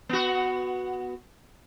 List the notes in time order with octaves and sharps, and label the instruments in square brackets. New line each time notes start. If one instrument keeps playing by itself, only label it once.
[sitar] B3 F#4